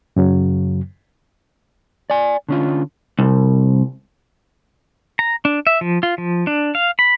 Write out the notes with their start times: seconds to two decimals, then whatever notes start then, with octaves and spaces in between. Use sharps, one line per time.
0.16 F#2 C#3 F#3
2.10 D5 G#5
2.49 D3 C#4 F4
3.19 C2
5.19 A#5
5.45 D4
5.67 E5
5.81 F3
6.03 F4
6.18 F3
6.47 D4
6.75 F5
6.99 B5